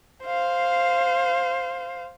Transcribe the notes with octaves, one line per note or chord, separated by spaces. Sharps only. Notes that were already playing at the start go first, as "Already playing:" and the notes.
C5 F5